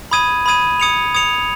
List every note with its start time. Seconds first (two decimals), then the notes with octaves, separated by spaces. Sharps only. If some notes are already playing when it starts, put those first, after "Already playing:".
0.11 B5 D#6 G#6 D#7
0.46 B5 D#6 G#6 D#7
0.80 D#6 G#6 C#7 F7
1.15 D#6 G#6 C#7 F7